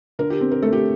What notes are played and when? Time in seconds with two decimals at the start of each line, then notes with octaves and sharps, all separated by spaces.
0.19 D3 A#4
0.30 G4
0.41 C4
0.51 A#4
0.62 A3 A4
0.73 G4